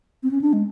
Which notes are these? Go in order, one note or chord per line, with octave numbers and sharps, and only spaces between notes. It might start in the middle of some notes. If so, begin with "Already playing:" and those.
C4
C#4
D4
G#3